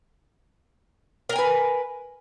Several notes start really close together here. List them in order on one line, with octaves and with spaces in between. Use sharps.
A#4 G5 G#5 B4